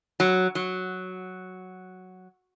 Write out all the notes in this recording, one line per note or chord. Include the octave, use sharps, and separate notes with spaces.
F#3
F#3